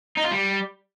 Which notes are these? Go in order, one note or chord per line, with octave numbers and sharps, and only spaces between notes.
D#4
F4
G3